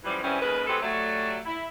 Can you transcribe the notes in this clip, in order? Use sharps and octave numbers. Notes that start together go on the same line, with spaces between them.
F#2 E3 F3 G3
F#2 C#3 E3 G3 C4 C#4
D#2 C#3 G#3 A#4 B4
G#3 B3 C4 D#4 G4 A4
F#3 G3 A3
E4